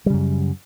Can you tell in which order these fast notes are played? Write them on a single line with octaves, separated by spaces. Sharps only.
G3 C#3 F#2